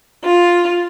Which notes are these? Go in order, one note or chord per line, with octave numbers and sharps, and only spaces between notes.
F4